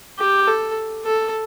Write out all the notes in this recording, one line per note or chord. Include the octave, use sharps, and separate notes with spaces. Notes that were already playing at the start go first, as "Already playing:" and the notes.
G4
A4
A4